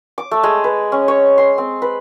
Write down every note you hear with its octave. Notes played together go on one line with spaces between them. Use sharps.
D6
A3
G#3
B4
C#4
C#5
C6
C4
B4